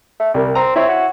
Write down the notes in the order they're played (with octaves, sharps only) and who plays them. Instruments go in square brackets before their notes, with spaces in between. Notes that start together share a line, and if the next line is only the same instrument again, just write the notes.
[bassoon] A3
[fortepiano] C2 A#4 [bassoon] G3
[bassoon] C4 [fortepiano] A#5
[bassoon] C4 [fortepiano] E4 C#5 E5
[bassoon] F#4